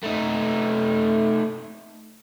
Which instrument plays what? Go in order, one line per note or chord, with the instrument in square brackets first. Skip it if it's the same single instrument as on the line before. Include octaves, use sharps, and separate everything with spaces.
[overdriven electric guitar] A3 D#4